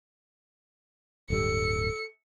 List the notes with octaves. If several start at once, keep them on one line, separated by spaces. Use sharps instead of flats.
D1 G2 G3 A4 C#7